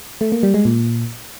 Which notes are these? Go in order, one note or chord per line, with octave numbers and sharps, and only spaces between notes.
A3
A#3
G3
G#3
A#2